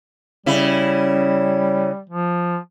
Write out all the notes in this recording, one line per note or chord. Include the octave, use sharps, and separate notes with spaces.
C#3 G3 E4
F3